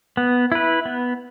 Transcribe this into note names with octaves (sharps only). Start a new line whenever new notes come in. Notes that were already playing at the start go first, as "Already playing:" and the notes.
B3
E4 B4
B3